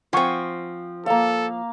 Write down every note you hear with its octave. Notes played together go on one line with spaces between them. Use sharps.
F3 C4 F#5 G#5 C#6
A#3 A4 F5